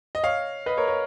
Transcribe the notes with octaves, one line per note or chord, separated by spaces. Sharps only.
D#5
C#5 F5
B4 D#5
A#4 C#5
A#4 C#5